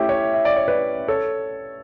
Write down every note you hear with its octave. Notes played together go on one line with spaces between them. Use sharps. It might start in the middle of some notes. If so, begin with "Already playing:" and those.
Already playing: A3 C#4 E4 G4
C#5 E5
E5
D5
C#5
B4 D5
A4 C#5